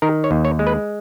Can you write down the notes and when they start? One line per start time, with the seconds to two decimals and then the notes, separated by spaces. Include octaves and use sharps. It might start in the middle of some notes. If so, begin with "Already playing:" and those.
0.02 D#3 A#4
0.24 C#5
0.31 D#2
0.45 C#5
0.59 G#3
0.67 B4